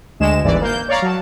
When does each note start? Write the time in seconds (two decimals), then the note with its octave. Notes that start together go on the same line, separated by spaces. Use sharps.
0.20 D2 G#3 E7
0.44 G1 D2 G#2 E3 D5
0.61 A#3 G6
0.88 C#5 D5 F5 A#5
1.02 F#3 A5